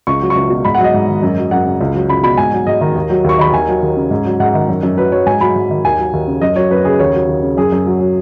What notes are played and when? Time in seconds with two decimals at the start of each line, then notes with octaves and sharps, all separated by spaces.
0.07 C#2 C#6
0.22 F#3
0.30 C#6
0.35 C#2
0.50 B2
0.65 G#2 B5
0.75 F#5
0.79 F#3
0.84 D#5
0.94 G#2
1.08 D#3
1.22 F#2
1.38 F#3
1.51 F#2 F#5
1.65 C#3
1.81 C#2
1.95 F#3
2.09 C#2 B5
2.23 B2 B5
2.37 G#2 G#5
2.52 F#3
2.67 G#2 D#5
2.81 D#3
2.96 D#2
3.10 F#3
3.24 D#2 C#6
3.39 D#3 B5
3.53 D#2 G#5
3.68 F#3
3.82 D#2
3.96 C#3
4.11 G#2
4.26 F#3
4.40 G#2 F#5
4.54 D#3
4.69 F#2
4.83 F#2
4.97 F#3 B4
5.12 F#3 C#5
5.26 G#2 G#5
5.41 F#3 B5
5.56 G#2
5.70 D#3
5.84 D#2 G#5
5.98 F#3
6.13 D#2
6.27 C#3
6.41 F#2 D#5
6.56 F#3 C#5
6.70 F#2 B4
6.85 C#3 G#4
6.99 D#2 C#5
7.14 F#3
7.28 D#2
7.42 C#3
7.57 F#2 G#4
7.72 F#2
7.86 F#3
8.01 F#3